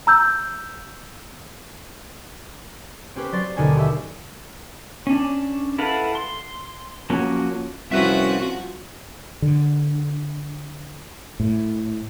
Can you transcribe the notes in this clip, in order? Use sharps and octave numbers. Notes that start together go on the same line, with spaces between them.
A#5 E6 G6
C4 C#4 G4 B4
F#3 D5 C6 A6
D#2 B2 D3 C#4 G#5 A5
G4 E5
C#4 D4
E4 A4 B4 F5 F#5
C6
F3 F#3 A#3 C#4 F#4
C2 F3 C#4 F#4 B4 E5
D3
A2